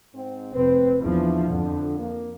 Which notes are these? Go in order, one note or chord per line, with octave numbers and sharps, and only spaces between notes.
G#2 C4
F1 C4 B4
E2 F3 D4 E4
F2 D3
A#3